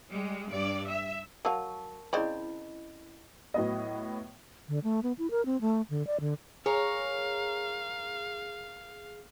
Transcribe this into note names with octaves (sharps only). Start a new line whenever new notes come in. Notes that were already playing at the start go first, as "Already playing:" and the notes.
G3 G#3
G2 D5
E5
F#3 A#4 F5 A5 C#6
C#3 C4 E4 D5 D#5 B5
A2 F#3 B3 D#5
D3
A3
B3
E4
A#4
C4
A3
D3
D5
D3
G#4 A#4 C#5 F5